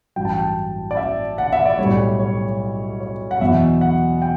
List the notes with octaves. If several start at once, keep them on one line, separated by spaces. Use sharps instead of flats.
A1 G2 F#3 G5
A5
G5
D5
E5
F#5
E5
D5
B1 A2 G3 C#5
C#5
C#5
F#5
E2 B2 F#3 E5
F#5
G5